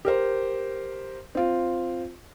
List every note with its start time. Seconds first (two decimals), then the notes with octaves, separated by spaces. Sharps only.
0.05 G4 A#4 C5
1.35 C4 F4